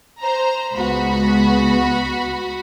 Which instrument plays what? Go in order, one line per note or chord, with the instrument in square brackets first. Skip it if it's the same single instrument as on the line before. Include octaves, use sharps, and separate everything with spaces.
[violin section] C5 A#5
[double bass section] C#2 G#3 B3 [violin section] F#4 B5